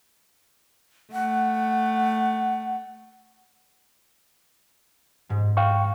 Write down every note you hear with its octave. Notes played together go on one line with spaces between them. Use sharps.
A3 F#5
G#2 G#3
F5 G5 C#6